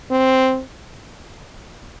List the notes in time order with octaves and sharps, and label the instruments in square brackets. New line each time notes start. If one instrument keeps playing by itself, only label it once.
[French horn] C4